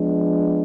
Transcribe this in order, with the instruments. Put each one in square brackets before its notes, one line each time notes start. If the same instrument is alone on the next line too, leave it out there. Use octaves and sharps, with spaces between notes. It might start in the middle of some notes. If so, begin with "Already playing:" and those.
Already playing: [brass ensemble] F3 G#3 B3 D4